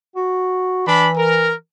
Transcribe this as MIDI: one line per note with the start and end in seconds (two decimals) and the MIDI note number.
0.16 0.83 66
0.87 1.55 52
0.87 1.10 62
0.87 1.10 83
1.17 1.52 70